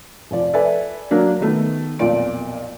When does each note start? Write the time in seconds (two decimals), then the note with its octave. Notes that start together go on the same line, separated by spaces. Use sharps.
0.31 F1 F3 D5
0.54 A4 B4 D5 E5 G#5
1.11 F#3 A#3 D4
1.41 D#3 A3 B3
1.99 B1 F2 A#2 D5 D7